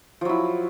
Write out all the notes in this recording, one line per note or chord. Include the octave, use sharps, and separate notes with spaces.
F3 F#3 E4